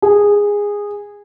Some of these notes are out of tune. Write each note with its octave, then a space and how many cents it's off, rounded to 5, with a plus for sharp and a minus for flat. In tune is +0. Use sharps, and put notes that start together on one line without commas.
G#4 -15